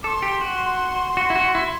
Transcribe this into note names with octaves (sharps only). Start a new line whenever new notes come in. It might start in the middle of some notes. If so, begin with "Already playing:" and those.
A4 C6 D6
G4
F#4
F#4
E4
F#4
E4